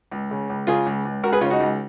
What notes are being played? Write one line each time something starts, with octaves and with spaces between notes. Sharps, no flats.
C#2
C#3
C#2
C#3 F4 G#4
C#2
C#2
C#2 F#4 A#4
G#4 B4
C#3 C#4 F4
D#4 F#4
C#2